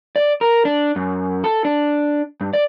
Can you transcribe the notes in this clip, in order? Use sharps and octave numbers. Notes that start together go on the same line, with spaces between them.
D5
A#4
D4
F#2
A4
D4
G2
D5